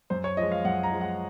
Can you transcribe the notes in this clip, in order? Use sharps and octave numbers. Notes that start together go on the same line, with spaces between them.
F#2 C5
C#5
F3 G#3 D#5
F5
F#2 F#5
A#5
F3 G#3
F#5